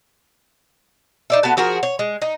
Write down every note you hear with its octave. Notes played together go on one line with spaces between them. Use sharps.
D#4 D5 E5
A3 B3 F#4 A5
F3 F#4 G#4 A#4
C#5
G#3
D#4